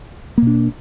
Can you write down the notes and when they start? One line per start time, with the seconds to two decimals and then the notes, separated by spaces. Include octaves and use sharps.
0.38 A#3
0.42 B2
0.47 D4